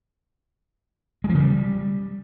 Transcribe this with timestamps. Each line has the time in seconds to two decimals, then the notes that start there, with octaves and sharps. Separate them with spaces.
1.24 G#3
1.29 F3
1.35 C#3
1.40 G3